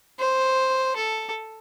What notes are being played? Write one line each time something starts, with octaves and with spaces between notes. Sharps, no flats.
C5
A4